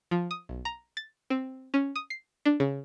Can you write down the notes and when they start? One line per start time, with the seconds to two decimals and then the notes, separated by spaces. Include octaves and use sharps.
0.11 F3
0.31 D#6
0.49 B1
0.65 A#5
0.97 A6
1.30 C4
1.74 C#4
1.96 D#6
2.10 C7
2.45 D4
2.60 C#3